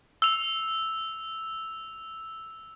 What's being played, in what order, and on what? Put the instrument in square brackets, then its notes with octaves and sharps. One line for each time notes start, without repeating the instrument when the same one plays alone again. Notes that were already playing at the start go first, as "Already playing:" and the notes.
[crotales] E6 F7